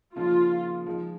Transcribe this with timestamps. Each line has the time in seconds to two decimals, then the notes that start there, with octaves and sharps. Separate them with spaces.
0.16 C#3 F3 A#3 D#4 F4
0.86 F3 G#3 D#4